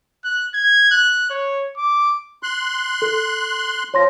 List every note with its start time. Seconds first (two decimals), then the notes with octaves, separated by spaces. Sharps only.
0.24 F#6
0.54 G#6
0.91 F#6
1.30 C#5
1.77 D6
2.43 C6 F#6
3.02 A4
3.94 F3 C#5 C6 A#6